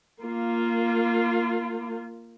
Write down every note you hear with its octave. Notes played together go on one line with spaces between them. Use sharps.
A#3 F4